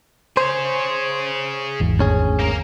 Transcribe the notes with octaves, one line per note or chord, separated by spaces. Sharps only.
G#4 C5 C#5
G#1 E2
D2 C#4 G#4
A#3 A#4